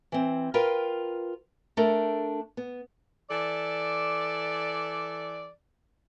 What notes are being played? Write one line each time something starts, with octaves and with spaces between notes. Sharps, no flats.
E3 C4
F4 A#4 B4 F5 G5
A3 D4 A4 A#4
B3
E3 A4 D5